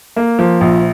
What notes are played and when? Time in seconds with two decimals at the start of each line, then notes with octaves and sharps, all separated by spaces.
0.16 A#3
0.39 F3
0.61 A#1